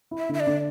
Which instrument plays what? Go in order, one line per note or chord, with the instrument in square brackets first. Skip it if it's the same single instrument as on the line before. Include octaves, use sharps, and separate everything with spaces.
[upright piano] E4
[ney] E5
[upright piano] D3 [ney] E5
[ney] D5
[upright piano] D3